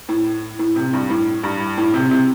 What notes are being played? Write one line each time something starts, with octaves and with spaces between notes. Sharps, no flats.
A2
A2
C3
G2
A2
G2
A2
C3
C3